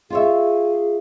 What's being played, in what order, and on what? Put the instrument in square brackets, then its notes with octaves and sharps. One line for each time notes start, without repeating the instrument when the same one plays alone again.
[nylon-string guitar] F4 C#5 E5 [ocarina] G#4